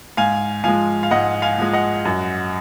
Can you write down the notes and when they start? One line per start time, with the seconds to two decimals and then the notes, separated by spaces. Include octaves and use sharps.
0.17 G#2 F5 G#5
0.64 F3 G#3 F5 G#5
1.03 F5
1.11 G#2 D#5 F#5
1.42 F5 G#5
1.58 F3 G#3
1.73 D#5 F#5
2.05 F#2